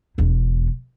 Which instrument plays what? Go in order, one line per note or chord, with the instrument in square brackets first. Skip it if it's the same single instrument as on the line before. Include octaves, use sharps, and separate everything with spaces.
[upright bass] E1 E2